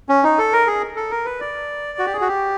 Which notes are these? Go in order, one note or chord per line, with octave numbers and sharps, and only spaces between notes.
C#4
D#4
A4
A#4
G#4
A4
A#4
B4
D5
F#4
G4
G#4
F#4
G4